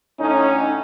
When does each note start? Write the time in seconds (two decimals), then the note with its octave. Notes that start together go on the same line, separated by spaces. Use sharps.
0.20 A2 D3 C#4 D#4